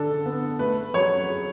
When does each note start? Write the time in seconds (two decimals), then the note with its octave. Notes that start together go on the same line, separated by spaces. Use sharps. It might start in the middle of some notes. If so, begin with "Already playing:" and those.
Already playing: D3 D4 A4
0.26 B3
0.59 A3 B4
0.94 F#3 C#5
1.29 G#4